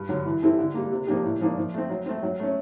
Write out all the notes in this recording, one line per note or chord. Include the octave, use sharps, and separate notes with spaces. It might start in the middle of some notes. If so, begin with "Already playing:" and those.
Already playing: G2
D3 F#3
E3
G3 C4 E4 A4
D3
G3 A#3
C3
F3 A#3 D4 G4
A2
F3 A#3 D4
F3
A3 C4
F#3
A3 C4
F#3
A3 C#4